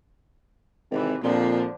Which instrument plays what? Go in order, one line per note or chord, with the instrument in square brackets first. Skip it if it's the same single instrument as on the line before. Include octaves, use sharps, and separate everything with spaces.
[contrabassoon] G#1 [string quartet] C3 E3
[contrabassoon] F2 [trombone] A#2 [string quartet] D3 F3 D4